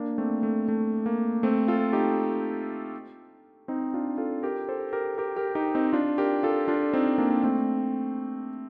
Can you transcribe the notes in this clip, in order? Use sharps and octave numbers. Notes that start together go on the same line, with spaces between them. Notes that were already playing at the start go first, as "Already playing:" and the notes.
Already playing: A#3 D4
A3 C4
A3
A3
A#3
A3 C4
F4 A4
D#4 G4
C4 D#4
D4 F4
F4 A4
G4 A#4
A4 C5
G4 A#4
G4 A#4
G4 A#4
D#4 G4
C4 D#4
D4 F4
G4 A#4
F4 A4
D4 F4
C4 D#4
A#3 D4
A3 C4